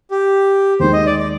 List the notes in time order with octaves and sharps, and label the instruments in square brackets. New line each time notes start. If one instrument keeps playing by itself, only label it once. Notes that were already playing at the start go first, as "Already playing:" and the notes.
[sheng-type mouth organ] G4
[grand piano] D#2 D#3 G#3 D#4 [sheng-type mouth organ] C5
[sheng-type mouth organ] D#5
D5
D5